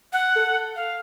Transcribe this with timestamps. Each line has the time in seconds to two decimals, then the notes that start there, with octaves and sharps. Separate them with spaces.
0.13 F#5
0.36 A4
0.76 F5